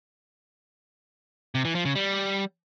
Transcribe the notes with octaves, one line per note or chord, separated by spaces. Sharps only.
C3
E3
F3
C#3
G3